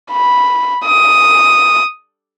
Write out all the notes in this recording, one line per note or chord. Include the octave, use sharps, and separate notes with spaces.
B5
D#6